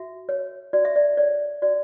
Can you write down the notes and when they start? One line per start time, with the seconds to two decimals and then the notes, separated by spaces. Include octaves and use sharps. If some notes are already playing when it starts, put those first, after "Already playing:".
Already playing: F#4 E5
0.29 C#5
0.73 F#4 D5
0.85 E5
0.96 D5
1.17 C#5 D5
1.62 F#4 D5